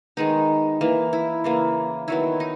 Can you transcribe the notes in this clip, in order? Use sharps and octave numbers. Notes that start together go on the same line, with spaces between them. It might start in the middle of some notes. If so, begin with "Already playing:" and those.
D#3 G#3 B3 D#4
E3 A#3
E4
C#3 E3 A#3
D#3 F#3 B3 E4
D#4